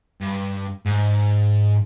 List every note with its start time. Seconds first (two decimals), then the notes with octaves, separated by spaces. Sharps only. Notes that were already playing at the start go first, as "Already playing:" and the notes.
0.21 G2
0.86 G#2